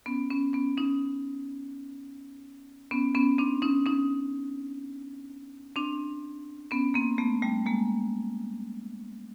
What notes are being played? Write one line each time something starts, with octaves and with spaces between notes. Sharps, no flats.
B3 C#4
B3 C#4
B3 C#4
C#4 D#4
B3 C#4
B3 C#4
C4 D4
C#4 D#4
C#4 D#4
C4 D4
B3 C#4
A#3 C4
A3 B3
G3 A3
G#3 A#3